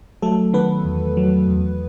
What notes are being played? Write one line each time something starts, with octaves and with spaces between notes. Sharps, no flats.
F#3 A3 A4
D#3 B3 B4
E2
F#3
E2